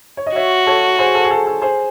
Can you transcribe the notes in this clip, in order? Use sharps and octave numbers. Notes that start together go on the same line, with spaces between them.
C#5
D#5
F#4 C#5 E5
A4 C#5
G#4 C5
A4
G#4
A4
A4
G#4 C5